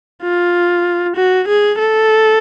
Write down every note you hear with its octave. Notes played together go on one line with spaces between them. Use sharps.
F4
F#4
G#4
A4